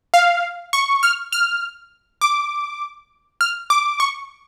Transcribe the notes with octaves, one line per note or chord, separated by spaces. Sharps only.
F5
C#6
F6
F6
D6
F6
D6
C#6